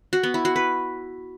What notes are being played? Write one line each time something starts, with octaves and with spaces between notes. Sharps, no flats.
F#4
B3
E4
F#4
B4